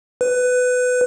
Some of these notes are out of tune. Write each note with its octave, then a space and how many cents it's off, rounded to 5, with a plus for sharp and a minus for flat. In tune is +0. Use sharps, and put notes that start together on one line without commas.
B4 +15